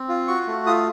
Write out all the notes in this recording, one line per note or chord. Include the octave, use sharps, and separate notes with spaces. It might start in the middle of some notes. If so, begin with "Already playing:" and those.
Already playing: C4
F4
F#4 C#6
A3
F4 D#6